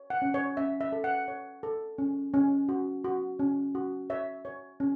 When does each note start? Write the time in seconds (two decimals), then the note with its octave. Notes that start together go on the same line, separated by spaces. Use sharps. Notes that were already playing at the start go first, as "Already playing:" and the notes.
Already playing: C#5
0.10 F#5
0.22 C#4
0.34 C#5
0.57 C#4 E5
0.81 E5
0.92 A4
1.04 F#5
1.28 C#5
1.63 A4
1.98 C#4
2.34 C#4
2.69 F#4
3.04 F#4
3.39 C#4
3.75 F#4
4.10 C#5 E5
4.45 C#5
4.80 C#4